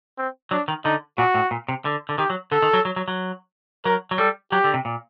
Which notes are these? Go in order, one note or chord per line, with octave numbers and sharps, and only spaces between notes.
C4
F#3 D4
D#3
D3 D#4
A#2 F#4
A2
A#2
C3
D3
D3
D#3 G4
F#3
D3 A4
D#3
F#3
F#3
F#3
F#3
F#3 A#4
F#3
G3 A4
F#3 G4
D3
C3
A#2